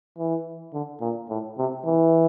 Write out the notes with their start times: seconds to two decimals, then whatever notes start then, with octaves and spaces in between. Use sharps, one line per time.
0.18 E3
0.73 D3
1.00 A#2
1.29 A2
1.58 C3
1.85 E3